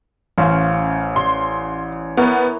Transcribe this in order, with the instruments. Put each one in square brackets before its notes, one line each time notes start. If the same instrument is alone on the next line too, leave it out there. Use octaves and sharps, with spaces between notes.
[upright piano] A1 [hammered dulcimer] C#4 C5 F5
[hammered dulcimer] D5 [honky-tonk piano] C6
[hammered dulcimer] E3 A#4 C#5 [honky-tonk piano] B3